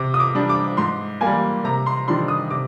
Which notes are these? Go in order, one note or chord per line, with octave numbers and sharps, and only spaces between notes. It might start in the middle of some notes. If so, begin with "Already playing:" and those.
Already playing: C3 D6
D#6
D6
G3 D4
D6
G#2 C6
G3 A#3 G#5
C3 A#5
C6
D#3 G3 D4 C6
D#6
C3 D6